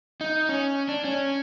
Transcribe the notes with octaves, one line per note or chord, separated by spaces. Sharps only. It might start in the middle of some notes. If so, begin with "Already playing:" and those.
D#4
C#4
D4
C#4